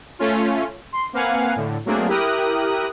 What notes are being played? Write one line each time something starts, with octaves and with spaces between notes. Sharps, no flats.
A3 C#4 F4
C6
A#3 C4 B4 F5 F#5 G#5
A2 D3
F#3 A3 A#3 C4 D4 G#4
E4 G4 A#4 D#6 F#6